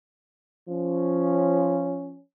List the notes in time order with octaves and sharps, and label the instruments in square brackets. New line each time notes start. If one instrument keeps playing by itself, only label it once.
[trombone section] F3 C#4